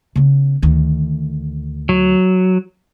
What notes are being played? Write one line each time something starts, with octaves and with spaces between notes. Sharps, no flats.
C#3 B3
D2 D#3
F#3